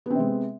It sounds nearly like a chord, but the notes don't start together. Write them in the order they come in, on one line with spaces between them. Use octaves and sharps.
B3 C4 C3 G#3